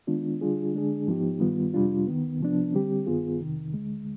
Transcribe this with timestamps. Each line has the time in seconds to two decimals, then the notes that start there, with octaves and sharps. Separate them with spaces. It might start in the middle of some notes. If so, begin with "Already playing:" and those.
0.07 D#3 G#3 B3 D4 F4
0.41 D3 G3 D4 F4 G#4
0.74 D3 G#3 D4 G#4
1.07 G#2 F3 B3 D#4 G4
1.40 G2 D#3 G3 B3 F4
1.74 F2 C3 G3 D4 F4
2.07 D#2 D#3 B3
2.41 C2 C3 F3 B3 D4
2.73 D3 G3 C4 G4
3.06 G2 D#3 B3 F4 G#4
3.39 F2 C3 D#3
3.74 D2 D3 G#3